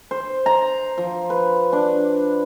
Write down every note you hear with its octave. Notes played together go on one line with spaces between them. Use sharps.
C5
A#5
F3
B4
D4